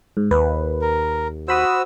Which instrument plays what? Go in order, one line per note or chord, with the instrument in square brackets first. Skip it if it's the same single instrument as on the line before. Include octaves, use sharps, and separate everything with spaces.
[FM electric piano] G#2
[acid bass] D#2 [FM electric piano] B4
[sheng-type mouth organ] A#4
[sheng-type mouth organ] F#4 E6 [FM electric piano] C5 B5 D#6